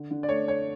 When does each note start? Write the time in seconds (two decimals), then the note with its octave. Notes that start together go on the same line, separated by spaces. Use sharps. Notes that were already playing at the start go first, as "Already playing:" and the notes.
Already playing: D3
0.11 D3
0.23 D5
0.29 A3 C#5
0.47 A3 C#5